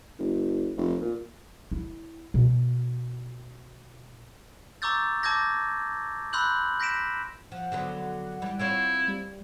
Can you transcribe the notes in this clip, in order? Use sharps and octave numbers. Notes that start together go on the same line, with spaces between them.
F#1
F1
A#2
E4
B2
A#5 C#6 D6 E6 G6 A6
A5 D6 E6 G6 G#6 A#6
B5 C6 E6 F#6 G6 F#7
G6 A#6 B6 D7 E7
F3 F#5
D3 F#3 B3
E3 G3
C4 E4 F4 C#5
G3